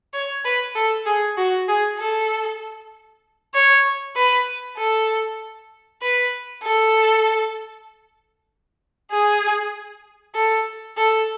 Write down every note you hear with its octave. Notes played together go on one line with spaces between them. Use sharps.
C#5
B4
A4
G#4
F#4
G#4
A4
C#5
B4
A4
B4
A4
G#4
A4
A4